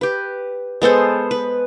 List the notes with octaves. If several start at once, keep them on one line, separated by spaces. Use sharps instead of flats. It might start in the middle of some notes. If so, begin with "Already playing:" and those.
G4 B4
G#3 B3 A4 C5
B4